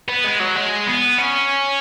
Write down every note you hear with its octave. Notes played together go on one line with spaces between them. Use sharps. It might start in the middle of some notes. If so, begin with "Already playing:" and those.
B3
G#3
F#3
G#3
B3
C#4